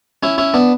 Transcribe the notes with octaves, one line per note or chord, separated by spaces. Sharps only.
C#4 E4
C#4 E4
B3 D4